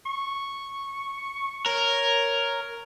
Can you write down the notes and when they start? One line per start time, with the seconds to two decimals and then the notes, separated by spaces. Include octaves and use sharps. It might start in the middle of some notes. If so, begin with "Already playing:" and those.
0.06 C#6
1.66 A#4 C#5